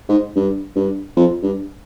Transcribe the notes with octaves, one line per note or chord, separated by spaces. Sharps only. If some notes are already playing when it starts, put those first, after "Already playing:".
G#2
G2
G2
F2
G2